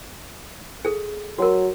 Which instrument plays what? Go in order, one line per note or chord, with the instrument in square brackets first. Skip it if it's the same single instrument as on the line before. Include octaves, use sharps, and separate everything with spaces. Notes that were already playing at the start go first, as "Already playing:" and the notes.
[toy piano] G#4 A4
[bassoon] F#3 [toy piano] F#4 A#4